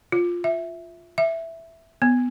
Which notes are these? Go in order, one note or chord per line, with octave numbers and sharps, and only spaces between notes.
F4
E5
E5
B3